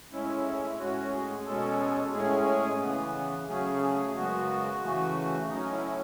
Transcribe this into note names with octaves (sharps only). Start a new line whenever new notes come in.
A2 G#3 C#4 E4
A2 G#3 C#4 F#4
G#4
B2 G#3 C#4 A4
A2 G#3 C#4 G#4
C#3 E3 B3
C#3 F#3 A3 C#4 G#4
G#4
F#2 C#3 G#3 B3 F#4
C#3 E3 A3
A2 F#3 C#4 D#4
E4